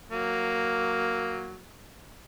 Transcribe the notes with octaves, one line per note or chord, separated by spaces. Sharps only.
F#3 A#3